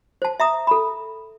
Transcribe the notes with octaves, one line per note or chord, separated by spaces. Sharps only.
C5 A5
E5 A#5 D#6
A4 B5